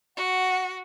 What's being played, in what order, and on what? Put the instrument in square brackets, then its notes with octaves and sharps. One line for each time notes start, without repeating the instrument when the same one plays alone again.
[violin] F#4 [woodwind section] F#5